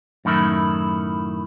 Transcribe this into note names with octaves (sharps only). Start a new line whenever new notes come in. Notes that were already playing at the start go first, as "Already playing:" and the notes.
F#2 A2 D#3 E4